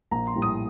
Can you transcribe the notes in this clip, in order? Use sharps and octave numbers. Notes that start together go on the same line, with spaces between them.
A#1 A#5
C6
A2 G3 A#3
D#6